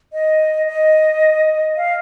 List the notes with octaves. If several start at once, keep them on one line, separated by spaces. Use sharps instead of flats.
D#5
D#5
F5